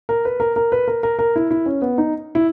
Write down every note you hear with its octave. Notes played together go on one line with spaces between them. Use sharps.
A#4
B4
A#4
A#4
B4
A#4
A#4
A#4
E4
E4
C#4
B3
D#4
E4